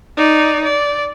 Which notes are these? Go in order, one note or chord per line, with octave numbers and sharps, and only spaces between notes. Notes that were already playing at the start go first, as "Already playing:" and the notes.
D#4 D5
D5